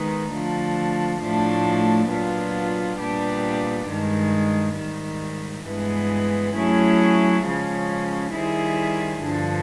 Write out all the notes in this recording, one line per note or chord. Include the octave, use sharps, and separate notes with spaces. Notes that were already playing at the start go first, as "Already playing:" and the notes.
Already playing: D#3 G#3 B3 D#4
D3 F3 A3
A2 F3 A3 D4
A#2 F#3 B3 D4 F4
A#2 G3 B3 D4 G4
G2 D#3 G#3
G#2 D#3 G3
G2 E3 G#3 B3
F#3 A3 C#4 E4 G#4
C#3 F3 G#3 C#4
D#3 G3 C4 E4 G#4
G2 D3 F3